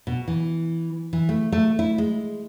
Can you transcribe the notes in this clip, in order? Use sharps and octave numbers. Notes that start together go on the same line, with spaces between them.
B2
E3
E3
A3
A3
E4
G#3